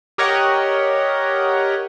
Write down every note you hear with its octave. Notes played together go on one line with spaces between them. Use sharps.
G4 A#4 C#5 D#5 F#5